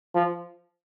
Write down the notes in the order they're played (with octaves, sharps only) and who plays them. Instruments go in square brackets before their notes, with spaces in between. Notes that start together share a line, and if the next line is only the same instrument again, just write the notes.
[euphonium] F3